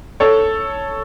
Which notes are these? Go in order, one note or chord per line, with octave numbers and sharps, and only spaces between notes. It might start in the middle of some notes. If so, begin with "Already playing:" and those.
A4 C#5